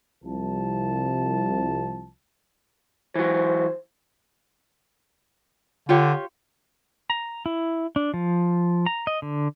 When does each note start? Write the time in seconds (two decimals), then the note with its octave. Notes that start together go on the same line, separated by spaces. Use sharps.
0.24 C2 F3 A5
3.15 E3 F#3 C5
5.89 D3 F4 G4 C#5
7.10 A#5
7.46 E4
7.96 D4
8.14 F3
8.86 A#5
9.07 D#5
9.22 D3